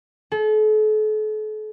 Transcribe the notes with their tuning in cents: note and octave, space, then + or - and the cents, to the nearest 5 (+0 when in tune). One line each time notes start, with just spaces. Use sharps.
A4 -40